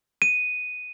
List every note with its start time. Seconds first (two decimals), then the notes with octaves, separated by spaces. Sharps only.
0.22 D#7